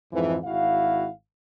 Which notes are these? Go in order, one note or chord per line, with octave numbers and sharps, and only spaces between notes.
F2 G#2 E3
G#1 E4 F#4 F5